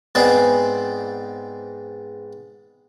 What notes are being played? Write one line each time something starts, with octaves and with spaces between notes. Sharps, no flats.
G#2 B3 C4 G#4 C5 D5